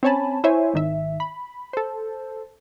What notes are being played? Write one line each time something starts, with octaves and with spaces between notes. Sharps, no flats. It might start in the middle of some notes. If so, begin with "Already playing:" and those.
C4 C#4 C#5 G#5 A5 B5
E4 C5 C#5 E5 G#5
G#1 D#3 E5
B5
A4 C5